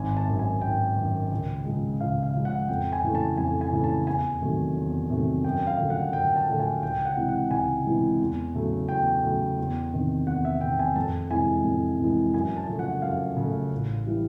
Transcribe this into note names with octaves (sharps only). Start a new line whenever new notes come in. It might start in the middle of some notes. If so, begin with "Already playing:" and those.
Already playing: G#1 G#5
A5
F#2 D#3
G#5
G#1 G5
D#3
F#2
C#2
C#3 F3 G#3
C#2 F5
F5
C#3 F3 G#3
F#5
F2 G5
G#5
C#3 E3 A3
A5
F2 G#5
G#5
C#3 E3 A3
A5
E2 G#5
C3 D#3 F#3 A3
E2
C3 D#3 F#3 A3
F#2 G5
F5
D3 F3 A3
F#5
F#2 G5
A5
D3 F3 A3 A5
G#5
C#2 G5
F#5
C3 E3 G#3
F#5
C#2 G#5
C3 E3 G#3
E2
C#3 F#3 A3
E2 G5
C#3 F#3 A3
E2
C3 D#3
E2 F#5
E5
C3 D#3 G5
G#5
F2 A5
C3 E3 G#3 G#5
F2
C3 E3 G#3
F#2 G#5
A5
C#3 F3 A3
F#5
F#2 F5
C#3 F3 A3
A1
E3 G3